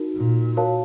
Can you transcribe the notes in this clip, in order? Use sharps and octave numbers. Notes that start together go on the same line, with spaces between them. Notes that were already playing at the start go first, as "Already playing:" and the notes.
Already playing: D#4 F#4 A#4
A#2
F#4 A#4 C#5 F5 A5